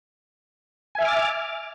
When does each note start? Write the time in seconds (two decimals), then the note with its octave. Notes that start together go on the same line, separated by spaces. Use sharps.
0.95 G#5
0.98 E5
1.02 F6
1.05 D6
1.08 A6